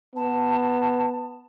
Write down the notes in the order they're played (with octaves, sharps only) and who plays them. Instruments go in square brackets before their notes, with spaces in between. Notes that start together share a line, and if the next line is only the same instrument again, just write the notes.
[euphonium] B3 [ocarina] A5